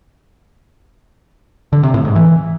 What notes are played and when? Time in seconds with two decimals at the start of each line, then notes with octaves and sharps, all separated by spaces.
1.73 D3
1.83 C3
1.94 A2
2.05 G#2
2.15 E3